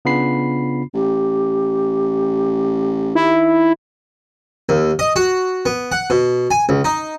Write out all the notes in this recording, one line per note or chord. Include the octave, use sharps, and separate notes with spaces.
C#3 B3 D4 F4 B5 C7
A1 G4
D#3 E4
D#2
D#5
F#4
B3
F#5
B2
G#5
C#2
D#4